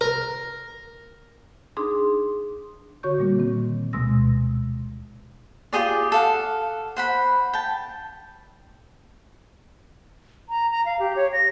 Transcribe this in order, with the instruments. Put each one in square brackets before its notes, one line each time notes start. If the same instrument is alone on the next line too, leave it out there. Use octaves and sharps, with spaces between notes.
[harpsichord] A#4
[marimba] D4 D#4 G#4 C6
D3 F#4 C#5 C#6 G6
A#2 G3 A#3
D#3 C4
D2 B2 G#3 C6 E6 A#6
[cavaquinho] F4 G4 G#4 D5
A4 F5 F#5
C5 F#5 B5
G5 A5
[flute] A#5
A#5
F5
G4
C#5
A#6